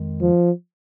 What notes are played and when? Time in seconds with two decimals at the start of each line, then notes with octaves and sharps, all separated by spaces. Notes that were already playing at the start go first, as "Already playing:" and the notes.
Already playing: F2 D#3 G#3
0.21 F3